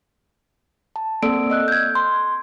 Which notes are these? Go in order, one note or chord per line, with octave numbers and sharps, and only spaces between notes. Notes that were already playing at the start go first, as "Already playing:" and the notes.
A5
A#3 C4 A4 D5 E6 D7
D#5 E6 F#6
G6 G#6
C6